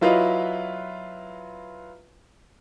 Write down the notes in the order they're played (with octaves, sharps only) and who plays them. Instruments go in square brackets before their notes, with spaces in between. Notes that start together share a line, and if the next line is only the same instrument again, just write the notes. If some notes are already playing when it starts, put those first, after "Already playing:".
[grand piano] F#3 E4 F4 B4 D#5 F5